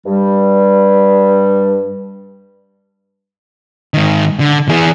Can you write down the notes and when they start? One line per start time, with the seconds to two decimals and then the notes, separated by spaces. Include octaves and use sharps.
0.06 G2 G3
3.94 G#2 D#3
4.40 D3
4.69 E3 G#4